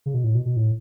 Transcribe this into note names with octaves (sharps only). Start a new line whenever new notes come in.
C#3
B2
A2
B2
B2
A2